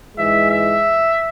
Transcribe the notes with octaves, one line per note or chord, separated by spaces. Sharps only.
G#2 E3 G#3 E5
E5